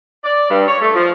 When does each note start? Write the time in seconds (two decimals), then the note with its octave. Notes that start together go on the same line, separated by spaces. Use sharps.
0.24 D5
0.50 G2
0.68 C#5
0.81 A3
0.95 F3